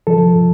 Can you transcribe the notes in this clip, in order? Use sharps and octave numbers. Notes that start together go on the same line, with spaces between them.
F3 A4